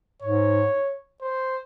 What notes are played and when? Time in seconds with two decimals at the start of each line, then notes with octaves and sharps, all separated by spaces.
0.22 G#2 C#5
1.22 C5